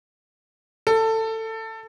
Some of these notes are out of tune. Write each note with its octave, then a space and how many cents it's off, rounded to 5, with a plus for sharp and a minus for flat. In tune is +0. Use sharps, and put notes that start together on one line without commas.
A4 +20